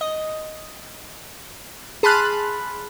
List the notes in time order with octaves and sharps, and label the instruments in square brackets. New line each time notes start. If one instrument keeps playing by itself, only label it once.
[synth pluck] D#5
G#4 A5 B5 C6 F6 F#6